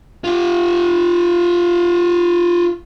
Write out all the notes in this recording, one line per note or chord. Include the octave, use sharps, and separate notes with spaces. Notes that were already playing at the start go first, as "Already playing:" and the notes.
F4 G4